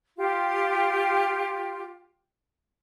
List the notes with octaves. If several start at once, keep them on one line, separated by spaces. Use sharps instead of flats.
F4 G4